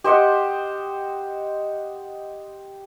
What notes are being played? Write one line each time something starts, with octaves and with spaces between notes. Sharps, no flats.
G4 C5 D#5 F#5